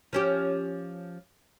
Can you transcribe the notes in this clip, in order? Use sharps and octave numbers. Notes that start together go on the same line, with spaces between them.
F3 C#4 G4